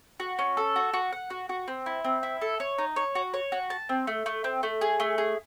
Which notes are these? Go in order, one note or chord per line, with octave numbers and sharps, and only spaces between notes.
F#4
C#4
A4
F#4
F#4
F#5
F#4
F#4
C4
E4
C4
E4
A4
C#5
D#4
C#5
F#4
C#5
F#4
A5
C4
A3
A3
C4
A3
G#4
A3
G#4